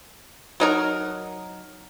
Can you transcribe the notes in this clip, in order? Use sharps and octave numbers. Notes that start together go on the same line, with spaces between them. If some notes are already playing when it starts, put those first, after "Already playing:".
F#3 D#4 A#4